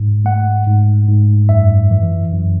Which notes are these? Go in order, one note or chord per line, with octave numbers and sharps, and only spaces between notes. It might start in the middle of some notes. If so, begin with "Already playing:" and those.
Already playing: G#2
A3 F#5
G#2
G#2
F#2 E5
E3
F#2